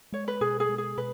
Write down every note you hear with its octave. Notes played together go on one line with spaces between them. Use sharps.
G#3 C#5
B4
B2 G#4
G#4
G#3
G#4
B2 B4